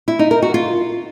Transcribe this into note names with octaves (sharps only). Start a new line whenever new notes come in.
E4
D#4
A#4
F#4
F4